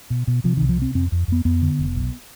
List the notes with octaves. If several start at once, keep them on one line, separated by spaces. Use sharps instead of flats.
B2
B2
C3 F3
D#3
C2
F3
C3 C4
F2 C4
F2
F2 B3
F2 B3
D3
F1
B1